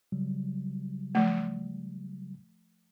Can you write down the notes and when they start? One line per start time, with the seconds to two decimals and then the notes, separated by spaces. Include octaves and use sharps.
0.12 C#3 F#3 G3
1.15 F3 A3